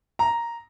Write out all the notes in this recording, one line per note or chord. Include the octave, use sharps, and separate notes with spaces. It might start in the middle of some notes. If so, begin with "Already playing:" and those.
A#5